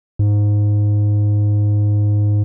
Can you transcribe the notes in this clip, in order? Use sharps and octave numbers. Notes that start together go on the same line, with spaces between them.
G#2